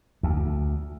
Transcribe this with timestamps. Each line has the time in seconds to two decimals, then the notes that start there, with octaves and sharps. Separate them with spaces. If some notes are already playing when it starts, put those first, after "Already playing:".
0.23 D2